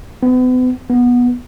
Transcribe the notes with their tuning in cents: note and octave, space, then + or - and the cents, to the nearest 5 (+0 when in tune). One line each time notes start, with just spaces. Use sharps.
B3 +40
B3 -15